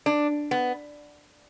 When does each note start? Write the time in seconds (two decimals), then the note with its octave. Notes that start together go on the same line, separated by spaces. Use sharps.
0.06 D4
0.51 B3